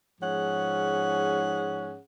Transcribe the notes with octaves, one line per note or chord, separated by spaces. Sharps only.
G#2 F3 C#4 G#4 F#5